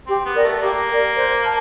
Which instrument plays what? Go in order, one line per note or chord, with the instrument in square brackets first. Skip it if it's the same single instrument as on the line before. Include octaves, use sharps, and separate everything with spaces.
[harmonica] C4 [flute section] G4
[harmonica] B3
[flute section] A#4 D5
[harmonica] A3
[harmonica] A#3 [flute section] G4
[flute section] A#4 D5
C5
A5